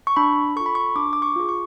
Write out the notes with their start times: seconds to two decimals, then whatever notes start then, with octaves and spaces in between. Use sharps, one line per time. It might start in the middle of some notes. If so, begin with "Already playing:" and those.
0.07 C#6
0.16 D4 B5
0.56 F4 A4 C#6
0.66 B5
0.75 C#6
0.96 D4 D6
1.13 D6
1.22 C#6
1.36 F4 G#4
1.49 C#6